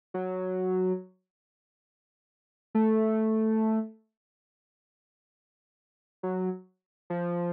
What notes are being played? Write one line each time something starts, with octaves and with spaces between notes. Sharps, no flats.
F#3
A3
F#3
F3